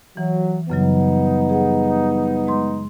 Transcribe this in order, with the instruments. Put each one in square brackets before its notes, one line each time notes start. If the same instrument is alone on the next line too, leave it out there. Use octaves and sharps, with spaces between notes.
[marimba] E3 [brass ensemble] F#3
[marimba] F#2 C#3 F#3 [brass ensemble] G3 B3 D#4
[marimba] G#4 F#5
G#3 C6